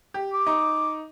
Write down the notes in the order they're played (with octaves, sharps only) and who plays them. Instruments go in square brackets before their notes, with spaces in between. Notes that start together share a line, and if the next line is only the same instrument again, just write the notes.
[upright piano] G4
[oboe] D6
[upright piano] D#4